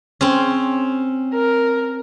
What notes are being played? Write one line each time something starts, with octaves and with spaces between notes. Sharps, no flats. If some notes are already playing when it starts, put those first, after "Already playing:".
C4 C#4
A#4